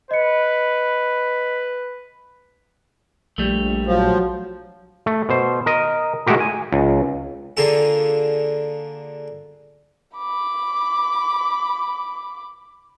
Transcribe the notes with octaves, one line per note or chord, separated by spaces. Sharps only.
B4 D#5 C#7
A#1 G3 A3
F3 F#3
A3
B2 C5
A#4 D#5
G#3 A3 F#4 G4 A#4
G#5
C#2
D3 A#3 F4 G#4 A4
B5 D6